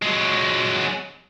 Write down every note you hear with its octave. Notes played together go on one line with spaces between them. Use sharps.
F#3 G#3